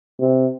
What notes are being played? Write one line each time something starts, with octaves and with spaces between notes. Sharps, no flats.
C3